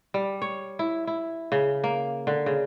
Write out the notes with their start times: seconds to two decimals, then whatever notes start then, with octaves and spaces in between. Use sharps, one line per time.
0.14 G3
0.42 C#5
0.79 E4
1.07 E4
1.52 C#3
1.84 A#3
2.27 D3
2.46 C#3